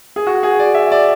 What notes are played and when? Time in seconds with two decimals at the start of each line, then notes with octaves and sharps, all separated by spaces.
0.16 G#4
0.27 F#4
0.43 G#4
0.59 D5
0.74 E5
0.92 D5